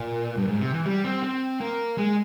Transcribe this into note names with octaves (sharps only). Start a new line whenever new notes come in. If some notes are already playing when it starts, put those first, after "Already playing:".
Already playing: A#2
G2
G#2
C3
E3
G3
C4
C4
A#3
G#3